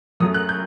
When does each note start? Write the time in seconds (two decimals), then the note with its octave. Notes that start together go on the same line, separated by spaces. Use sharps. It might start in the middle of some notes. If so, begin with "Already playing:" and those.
0.20 F#2 F#3 A3 D#6
0.34 F#6
0.49 G6